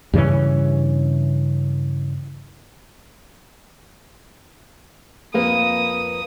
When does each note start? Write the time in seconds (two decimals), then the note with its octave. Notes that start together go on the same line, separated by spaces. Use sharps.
0.14 G2 C#3 E3 C#4
5.34 F2 A#3 B4 D#6